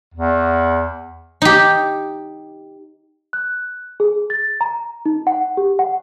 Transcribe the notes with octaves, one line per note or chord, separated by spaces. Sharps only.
E2
D#4 G4
F#6
G#4
A6
A#5
D#4
F#5
G4
F#5